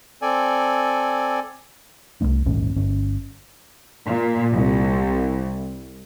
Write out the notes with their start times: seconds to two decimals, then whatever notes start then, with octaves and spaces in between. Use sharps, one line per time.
0.22 C4 A4 D5 G#5
2.21 C2 F#2 A3 D4
2.45 A#1 D#2 G#2 C#4
2.76 G1 C#4
4.06 A#2
4.52 C2